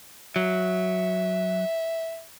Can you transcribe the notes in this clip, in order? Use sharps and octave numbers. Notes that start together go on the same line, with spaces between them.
F#3 E5